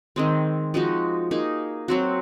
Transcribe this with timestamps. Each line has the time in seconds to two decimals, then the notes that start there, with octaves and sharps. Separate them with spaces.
0.16 D#3 G#3 C4
0.74 F3 G#3 D#4 F#4
1.31 A#3 D#4 G#4
1.88 F#3 C4 F#4